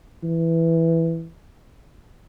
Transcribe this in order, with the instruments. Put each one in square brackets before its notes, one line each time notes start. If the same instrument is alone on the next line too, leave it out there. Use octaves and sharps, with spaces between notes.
[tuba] E3